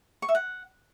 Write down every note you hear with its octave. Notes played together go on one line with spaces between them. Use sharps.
C#6
E5
F#5